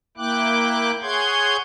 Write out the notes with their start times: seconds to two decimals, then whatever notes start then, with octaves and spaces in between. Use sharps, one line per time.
0.17 A#3 E4 G5 D6 F#6
1.02 G#4 C#5 F#5 C6 G6 G#6